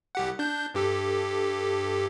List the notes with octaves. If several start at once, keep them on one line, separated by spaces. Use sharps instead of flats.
C2 G4 F#5
D4 G6
G2 G4 A4